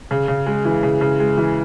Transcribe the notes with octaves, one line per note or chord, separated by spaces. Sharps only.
C#3
C#3
G#3
E3
C#3
C#3
G#3
E3